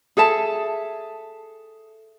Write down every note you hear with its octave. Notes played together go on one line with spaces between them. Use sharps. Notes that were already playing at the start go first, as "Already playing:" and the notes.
G#4 A4 E5 A5